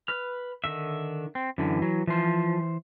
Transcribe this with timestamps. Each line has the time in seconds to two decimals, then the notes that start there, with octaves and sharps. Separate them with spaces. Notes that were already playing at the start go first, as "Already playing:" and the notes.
0.08 B4 F6
0.64 D3 D#3 E5
1.35 C4
1.58 F#2 D3 E3
1.82 F#3
2.07 E3 F3 C5